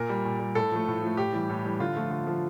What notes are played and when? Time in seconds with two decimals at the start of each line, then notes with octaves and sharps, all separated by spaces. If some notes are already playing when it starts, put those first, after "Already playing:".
Already playing: A#2 A#4
0.09 G3
0.25 A#2
0.40 G3
0.55 A2 A4
0.72 F3 A3
0.87 A2
1.02 F3 A3
1.17 A2 G4
1.33 E3 G3
1.49 A2
1.65 E3 G3
1.80 D3 F4
1.96 F3 A3
2.10 D3
2.26 F3 A3